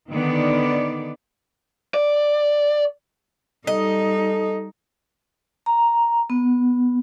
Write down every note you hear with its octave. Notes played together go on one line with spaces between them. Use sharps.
D3 D#3 B3 D5
D5
G3 D#4 A4 D#5
A#5
B3